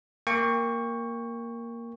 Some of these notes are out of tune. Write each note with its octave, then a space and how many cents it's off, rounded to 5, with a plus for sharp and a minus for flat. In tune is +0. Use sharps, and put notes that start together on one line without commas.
A#3 +0 G5 +30 C#6 +0